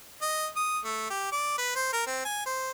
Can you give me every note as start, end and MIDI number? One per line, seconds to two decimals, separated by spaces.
0.22 0.47 75
0.56 0.79 87
0.84 1.08 57
1.10 1.28 67
1.32 1.56 74
1.58 1.71 71
1.76 1.88 72
1.93 2.02 70
2.07 2.21 60
2.25 2.43 80
2.46 2.71 72